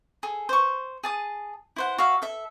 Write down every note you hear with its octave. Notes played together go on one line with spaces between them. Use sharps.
G#4 A4
C5 C#6
G#4 A5 D#6
E4 C5 F#5
F#4 C#5 E5 F5
A4 E5